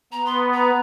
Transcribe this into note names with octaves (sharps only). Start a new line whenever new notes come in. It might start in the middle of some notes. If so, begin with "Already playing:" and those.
B3 A#5
C6
A#5